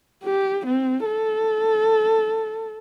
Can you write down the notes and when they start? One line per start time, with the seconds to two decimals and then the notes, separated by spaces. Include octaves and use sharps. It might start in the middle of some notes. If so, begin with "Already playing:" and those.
0.24 G4
0.66 C4
1.05 A4